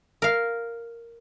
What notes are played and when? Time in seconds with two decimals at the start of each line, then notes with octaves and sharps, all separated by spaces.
0.22 A#4 F5